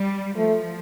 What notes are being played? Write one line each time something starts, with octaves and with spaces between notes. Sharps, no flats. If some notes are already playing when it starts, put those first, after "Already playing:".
Already playing: G3
F3 A3